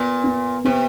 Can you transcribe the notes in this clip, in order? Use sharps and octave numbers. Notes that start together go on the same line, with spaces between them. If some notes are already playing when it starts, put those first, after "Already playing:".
Already playing: A#2 B3
B3
C3 B3